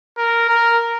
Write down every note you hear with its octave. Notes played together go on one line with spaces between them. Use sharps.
A#4
A#4